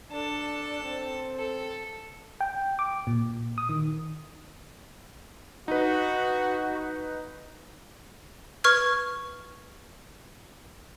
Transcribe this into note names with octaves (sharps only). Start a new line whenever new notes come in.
D4 A4 A5
C4
A4
G5
D6
A#2
D#6
D#3
D#4 F#4 B4
B4 C#6 F6 G#6